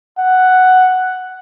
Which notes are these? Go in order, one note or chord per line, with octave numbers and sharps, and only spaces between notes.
F#5